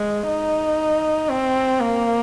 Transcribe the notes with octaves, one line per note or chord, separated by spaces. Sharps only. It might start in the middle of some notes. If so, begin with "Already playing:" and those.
Already playing: G#3
D#4
C4
A#3